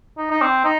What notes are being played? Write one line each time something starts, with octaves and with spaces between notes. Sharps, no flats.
D#4
D#4
C4
D#4